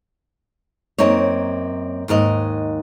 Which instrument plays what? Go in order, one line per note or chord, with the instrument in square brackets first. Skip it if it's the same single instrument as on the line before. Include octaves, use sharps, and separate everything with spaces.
[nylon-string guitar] F#2 A#3 C4 D#4 C#5
D#2 G#2 A#4 D#5